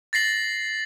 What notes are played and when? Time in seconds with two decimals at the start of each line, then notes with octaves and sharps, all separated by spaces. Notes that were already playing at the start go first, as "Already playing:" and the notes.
0.13 A6 A#6 C7 F#7